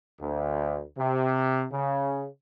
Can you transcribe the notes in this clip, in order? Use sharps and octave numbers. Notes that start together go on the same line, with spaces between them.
D2
C3
C#3